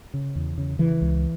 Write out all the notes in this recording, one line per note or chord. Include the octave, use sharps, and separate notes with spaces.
C#3
E2
C#3
C#3 E3
C#2